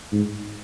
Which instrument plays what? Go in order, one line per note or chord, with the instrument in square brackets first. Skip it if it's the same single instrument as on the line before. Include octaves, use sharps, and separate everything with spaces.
[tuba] G#2